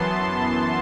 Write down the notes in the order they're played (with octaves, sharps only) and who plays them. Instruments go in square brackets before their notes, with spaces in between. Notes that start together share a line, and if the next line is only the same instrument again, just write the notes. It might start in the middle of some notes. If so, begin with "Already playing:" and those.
Already playing: [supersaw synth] F#2 E3 B3 A5 C6